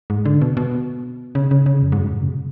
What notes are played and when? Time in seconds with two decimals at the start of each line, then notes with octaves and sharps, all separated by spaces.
0.10 G#2
0.25 D3
0.42 B2
0.57 B2
1.35 C#3
1.51 C#3
1.66 C#3
1.83 F2
1.92 G#2
1.98 F#2
2.13 A2
2.22 C#3
2.29 B2